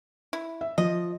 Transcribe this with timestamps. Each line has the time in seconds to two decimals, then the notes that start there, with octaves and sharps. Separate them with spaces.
0.33 E4
0.61 E5
0.78 F3 D#5